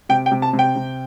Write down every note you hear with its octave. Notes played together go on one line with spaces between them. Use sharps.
C3 G5
G5
C3
A5
C3
G5
C3